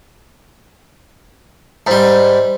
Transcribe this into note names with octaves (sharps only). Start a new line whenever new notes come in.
G#2 G3